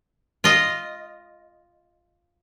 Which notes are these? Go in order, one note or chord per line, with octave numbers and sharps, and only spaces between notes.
F4 D#5